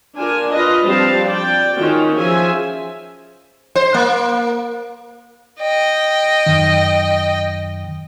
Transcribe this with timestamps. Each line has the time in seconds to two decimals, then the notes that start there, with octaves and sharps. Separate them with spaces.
0.15 D4 F4 A#4 G#5
0.52 F4 B4 D#5
0.83 F3 G3 C4 D4 F5 A5
1.28 D5 G5
1.77 D#3 C#4 F4 F#4
2.18 F3 G#4 E5 G#5
3.75 C5
3.94 A#3
5.60 D#5 G5
6.46 F#2 D#3